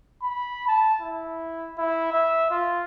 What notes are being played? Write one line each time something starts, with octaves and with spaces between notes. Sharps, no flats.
B5
A5
E4
E4
E5
F4